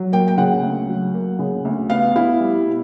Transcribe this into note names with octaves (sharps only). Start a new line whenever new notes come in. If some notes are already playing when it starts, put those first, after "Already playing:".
Already playing: F#3
A#3 G5
G5
C#3 F#5
D2
F#3
A#3
C#3
D2
B3 F5
E4 F5
G3
B2